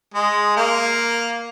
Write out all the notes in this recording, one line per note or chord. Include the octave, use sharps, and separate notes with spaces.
G#3
A#3